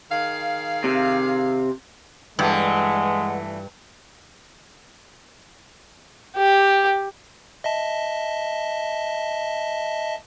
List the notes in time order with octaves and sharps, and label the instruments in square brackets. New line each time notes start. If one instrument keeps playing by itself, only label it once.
[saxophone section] D#3 G#4 F5
[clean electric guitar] C3
[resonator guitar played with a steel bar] G2 [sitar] E3 A3 [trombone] G#3 [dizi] F#5
[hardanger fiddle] G4
[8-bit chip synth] D#5 E5 A5